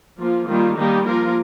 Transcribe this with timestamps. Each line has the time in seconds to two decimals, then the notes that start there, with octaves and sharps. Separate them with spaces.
0.21 F3 A#3 F4
0.48 D#3 G3 A#3 F4
0.77 D#3 G3 A#3 D#4 G4
1.05 F3 A#3 F4 A#4